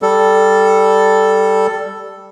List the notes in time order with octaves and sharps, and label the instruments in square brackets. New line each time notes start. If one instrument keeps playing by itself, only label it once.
[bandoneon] G3 A4